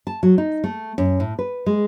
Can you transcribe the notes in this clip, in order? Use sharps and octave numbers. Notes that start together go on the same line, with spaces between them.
A5
F#3
D#4
A3
F#2
A2
B4
G#3